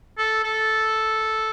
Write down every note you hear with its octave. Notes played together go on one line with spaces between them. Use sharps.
A4
A4